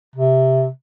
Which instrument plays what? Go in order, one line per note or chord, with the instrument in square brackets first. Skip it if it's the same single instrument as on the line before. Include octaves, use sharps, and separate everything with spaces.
[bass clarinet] C3